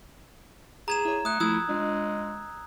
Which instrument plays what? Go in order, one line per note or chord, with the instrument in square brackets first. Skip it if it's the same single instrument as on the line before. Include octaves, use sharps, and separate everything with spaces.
[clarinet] G#4 [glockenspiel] A#5 G#6 E7
[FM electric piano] E4 C#5
[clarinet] A3 [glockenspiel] D#6 F#6
[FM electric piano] F3 A3 [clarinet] E4 [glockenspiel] D#6 E6 G#6
[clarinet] G#3 [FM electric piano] D4 F4